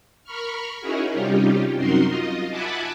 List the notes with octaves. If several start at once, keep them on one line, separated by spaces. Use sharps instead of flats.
A#4 B5 C#6 F6
C#4 D#4 E4 F#4 G#4 A#4
C3 G3 C#4 D#4 F4 G4
F#2 C3 D#4 F#4 A#4 C6
F4 D#5
E5 F#5 G#5 A5 B5 D6